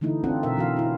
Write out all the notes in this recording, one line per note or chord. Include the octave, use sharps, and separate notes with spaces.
D3 E3 A3 D#4 E4
C4 D4 F4 A4 F#5
B2 A#4 E5
E3 F#4 F5
C#4 E4